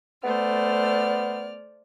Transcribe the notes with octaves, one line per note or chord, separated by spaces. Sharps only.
A3 B3 C5 D5 F6